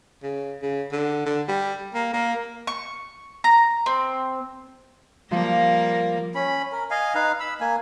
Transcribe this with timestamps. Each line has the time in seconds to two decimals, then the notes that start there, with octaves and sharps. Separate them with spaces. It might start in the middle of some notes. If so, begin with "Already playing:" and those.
0.23 C#3
0.62 C#3
0.92 D3
1.26 D3
1.48 G3
1.94 A#3
2.14 A#3
2.67 C#6
3.44 A#5
3.86 C4
5.31 F3 G3 A#3 A#4
6.35 C#4 B5
6.72 A#4
6.90 D#5 F5 G#5
7.15 D#4 B4 F5
7.40 B5 E6
7.61 A#3 G#5